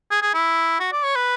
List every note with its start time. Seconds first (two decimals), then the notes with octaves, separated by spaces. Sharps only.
0.11 G#4
0.22 G#4
0.34 E4
0.80 F#4
0.92 D5
1.03 C#5
1.16 B4